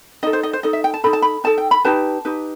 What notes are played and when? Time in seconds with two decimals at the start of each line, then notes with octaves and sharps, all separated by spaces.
0.23 D#4 A4 D#5
0.33 C5
0.43 D#5
0.53 C5
0.63 D#4 A4 D#5
0.73 E5
0.84 G5
0.94 A5
1.04 D#4 A4 B5
1.13 A5
1.22 B5
1.44 D#4 A4 A5
1.58 G5
1.71 B5
1.84 D#4 G4 B4 A5
2.25 D#4 G4 B4